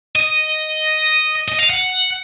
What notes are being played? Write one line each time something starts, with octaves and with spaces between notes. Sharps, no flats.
D#5
D#5
F5
F#5